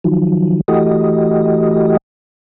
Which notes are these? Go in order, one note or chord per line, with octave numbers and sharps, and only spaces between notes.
D#3 F3 F#3
E3 A3 F#4 G4 D#5